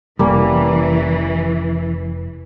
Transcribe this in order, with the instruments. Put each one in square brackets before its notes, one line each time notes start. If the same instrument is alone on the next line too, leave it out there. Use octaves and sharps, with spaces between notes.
[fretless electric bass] F1 [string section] E3 [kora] G3 A#3 C#4